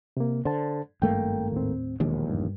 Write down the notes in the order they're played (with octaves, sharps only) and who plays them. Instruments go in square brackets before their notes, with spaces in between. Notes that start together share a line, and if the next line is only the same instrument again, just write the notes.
[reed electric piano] C3 A#3
[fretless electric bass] D3 [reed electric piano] C5 A5
[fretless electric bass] G#1 A3 A#3 [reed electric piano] G2 G5
[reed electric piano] D#2 A2 C4
[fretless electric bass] E1 A#1 D#2 [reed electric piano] D#3
[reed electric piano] G2